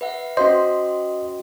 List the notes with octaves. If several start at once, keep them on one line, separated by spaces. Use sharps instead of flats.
B4 E5 F#5
C#4 F#4 C5 D#5 C6